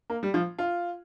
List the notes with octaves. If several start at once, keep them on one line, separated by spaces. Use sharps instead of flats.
A#3
G3
F3
F4